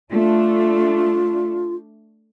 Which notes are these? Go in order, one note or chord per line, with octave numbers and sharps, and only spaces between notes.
A3 D4 F4